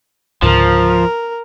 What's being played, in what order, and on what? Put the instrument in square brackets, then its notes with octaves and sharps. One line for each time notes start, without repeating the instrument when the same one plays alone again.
[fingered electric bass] C#2 G#2 D3 [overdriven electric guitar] F3 [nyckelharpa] A#4